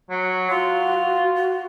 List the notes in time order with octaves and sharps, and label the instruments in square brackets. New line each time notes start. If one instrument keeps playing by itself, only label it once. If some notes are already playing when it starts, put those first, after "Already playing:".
[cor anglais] F#3
[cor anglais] F4 [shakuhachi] F#4
[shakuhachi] F#4